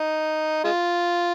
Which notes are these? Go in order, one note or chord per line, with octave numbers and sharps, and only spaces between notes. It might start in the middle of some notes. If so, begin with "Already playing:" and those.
Already playing: D#4
G#3 F4